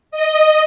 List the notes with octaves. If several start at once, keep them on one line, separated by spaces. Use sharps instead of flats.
D#5